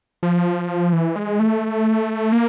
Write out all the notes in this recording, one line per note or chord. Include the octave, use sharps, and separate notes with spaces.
F3
E3
G#3
A3
A#3